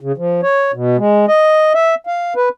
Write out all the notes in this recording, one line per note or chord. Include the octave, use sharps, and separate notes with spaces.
C#3
F3
C#5
B2
G#3
D#5
E5
F5
B4